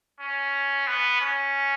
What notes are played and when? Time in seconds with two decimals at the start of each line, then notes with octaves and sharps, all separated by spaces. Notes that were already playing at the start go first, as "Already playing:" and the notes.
0.20 C#4
0.87 B3
1.21 C#4